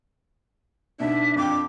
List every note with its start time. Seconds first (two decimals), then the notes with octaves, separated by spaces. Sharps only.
1.00 B2 D4 D#4 E5
1.36 F2 F5 G5 D6